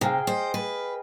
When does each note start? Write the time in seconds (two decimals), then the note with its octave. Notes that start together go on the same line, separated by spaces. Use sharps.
0.01 C3 G#4 F5 G5
0.27 C5 D#5
0.54 B4